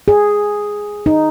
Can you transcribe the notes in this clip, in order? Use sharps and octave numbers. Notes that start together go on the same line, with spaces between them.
G#4
D#4